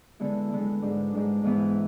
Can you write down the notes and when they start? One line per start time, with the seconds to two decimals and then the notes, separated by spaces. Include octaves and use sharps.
0.20 D3 G#3 B3 E4
0.51 D3 G#3 B3 E4
0.82 G#2 G#3 D4
1.12 G#2 G#3 D4
1.44 G#2 E3 B3 E4